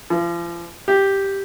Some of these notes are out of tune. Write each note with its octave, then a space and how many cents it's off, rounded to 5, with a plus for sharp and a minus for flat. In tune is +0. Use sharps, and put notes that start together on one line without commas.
F3 -40
G4 +0